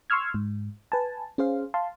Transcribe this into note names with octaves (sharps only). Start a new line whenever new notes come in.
C6 C#6 E6 F6 G#6
G#2
B4 G#5 A5
C#4 G#4 C5 F5
F5 A5 C6